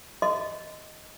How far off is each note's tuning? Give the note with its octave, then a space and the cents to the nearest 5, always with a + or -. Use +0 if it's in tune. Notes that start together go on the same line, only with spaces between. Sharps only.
D#5 +0 C6 -30